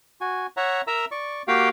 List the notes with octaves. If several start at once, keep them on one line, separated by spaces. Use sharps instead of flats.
F#4 G#5
C#5 E5 F#5 A#5
A#4 E5 A#5 E6
D5 C#6
A#3 F#4 G4 F5 G5